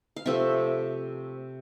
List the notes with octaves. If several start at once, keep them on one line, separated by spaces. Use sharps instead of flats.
F5
C3 F3 A3 C4 E5